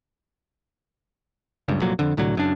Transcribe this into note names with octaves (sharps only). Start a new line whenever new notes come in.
F#1 C#2 G2
C2 F2 A#2 F#3
F2 D3
C2 A2 D3 F#3
F#1 F#2 D4